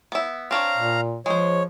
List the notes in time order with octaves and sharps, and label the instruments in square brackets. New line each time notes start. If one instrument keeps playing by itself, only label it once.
[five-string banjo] B3 E4
[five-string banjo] C4 D4 C#5 [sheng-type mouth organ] F5 A#5
[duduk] A#2
[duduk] F3 [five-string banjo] G#3 C5 [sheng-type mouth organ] C#5